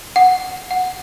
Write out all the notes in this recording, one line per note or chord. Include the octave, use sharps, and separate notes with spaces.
F#5
F#5